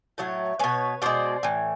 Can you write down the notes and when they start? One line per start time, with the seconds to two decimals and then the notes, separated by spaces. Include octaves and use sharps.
0.18 A2 F#3 A3 C#5
0.59 B2 G#3 B4 C#5
1.02 B2 G#3 C5 D5
1.43 A2 E3